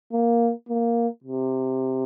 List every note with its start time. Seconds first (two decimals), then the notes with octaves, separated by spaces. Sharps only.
0.13 A#3
0.69 A#3
1.24 C3